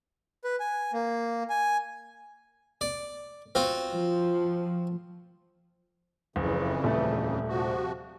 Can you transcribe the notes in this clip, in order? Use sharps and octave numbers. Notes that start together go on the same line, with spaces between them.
B4
G#5
A#3
G#5
D5
C4 F4 F#4
F3
F#1 F2 C#3 E3
D#1 A3
C3 F3 F#4